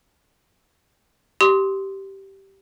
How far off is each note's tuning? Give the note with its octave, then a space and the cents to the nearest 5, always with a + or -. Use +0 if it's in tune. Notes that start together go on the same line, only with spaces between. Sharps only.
G4 -10 C6 +0 D#6 +40